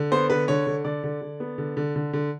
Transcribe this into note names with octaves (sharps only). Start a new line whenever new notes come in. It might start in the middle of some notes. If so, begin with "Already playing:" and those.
Already playing: D3
B3 C5
D3 B4
D3 C#5
D3
D3 D5
D3
D3
B3
D3
D3
D3
D3